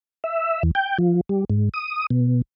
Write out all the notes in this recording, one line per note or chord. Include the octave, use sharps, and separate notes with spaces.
E5
E2
G5
F3
G3
G#2
D#6
B2